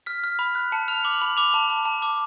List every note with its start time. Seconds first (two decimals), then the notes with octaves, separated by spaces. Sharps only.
0.06 F6 B6
0.24 F6
0.39 B5
0.55 F#6
0.72 A5 C#7
0.88 F6 F7
1.04 D6 F#7
1.21 B5 F#7
1.37 D6 F7
1.54 A5
1.70 A5
1.85 A5
2.02 D6